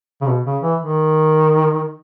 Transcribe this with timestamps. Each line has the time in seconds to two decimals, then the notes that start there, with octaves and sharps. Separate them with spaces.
0.21 C#3
0.27 B2
0.45 C#3
0.63 E3
0.80 D#3